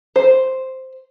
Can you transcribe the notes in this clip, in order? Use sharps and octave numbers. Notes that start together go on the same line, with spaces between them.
C5